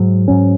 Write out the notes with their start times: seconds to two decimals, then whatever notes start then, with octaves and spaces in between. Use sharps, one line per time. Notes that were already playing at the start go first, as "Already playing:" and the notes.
Already playing: G#2 F#3
0.28 G#2 F#3 C#4